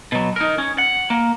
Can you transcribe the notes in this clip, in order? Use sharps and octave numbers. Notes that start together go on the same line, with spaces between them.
B2 F#3
D#4 A#4
C#4
F#5
A#3